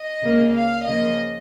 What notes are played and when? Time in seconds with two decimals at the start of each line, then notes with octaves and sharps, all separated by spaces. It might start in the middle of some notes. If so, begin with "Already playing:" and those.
Already playing: D#5
0.23 C#2 C#3 A#3
0.55 F5
0.87 C#3 F3 A#3 D#5